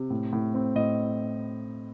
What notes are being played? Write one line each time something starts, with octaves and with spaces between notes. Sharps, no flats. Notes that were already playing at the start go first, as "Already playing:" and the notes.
Already playing: C3
A2
A2
C4
A2 D#5